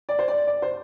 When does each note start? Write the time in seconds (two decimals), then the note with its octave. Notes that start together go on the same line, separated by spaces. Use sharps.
0.09 D5
0.19 C5
0.28 D5
0.47 D5
0.62 C5